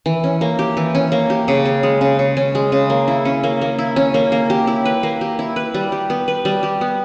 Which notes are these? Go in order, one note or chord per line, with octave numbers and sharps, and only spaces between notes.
E3
C#4
A#3
G4
E3
C#4
A#3
G4
C#3
C#4
G#3
C#3
C#3
C#4
G#3
C#3
A#3
E4
C#4
A#3
A#3
E4
C#4
A#3
A#3
G4
E4
B4
A#3
G4
E4
B4
G3
G4
B3
B4
G3
G4
B3